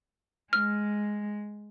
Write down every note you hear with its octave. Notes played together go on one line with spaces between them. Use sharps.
G#3 F6